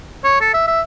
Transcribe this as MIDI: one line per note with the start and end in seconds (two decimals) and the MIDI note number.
0.24 0.38 73
0.41 0.53 69
0.54 0.65 76
0.67 0.81 76